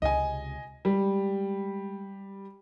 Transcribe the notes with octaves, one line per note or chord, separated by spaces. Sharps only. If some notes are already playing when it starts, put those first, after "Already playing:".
C#2 C3 D#5 G#5
G3 G#3